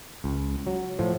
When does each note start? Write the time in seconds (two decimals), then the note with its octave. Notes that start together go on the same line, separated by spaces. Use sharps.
0.24 C#2
0.67 F#3
0.99 A2 F3